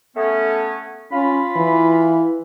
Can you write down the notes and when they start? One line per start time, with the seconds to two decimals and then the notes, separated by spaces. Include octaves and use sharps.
0.17 A3 B3 C#4
1.12 C#4 F4 B5
1.56 E3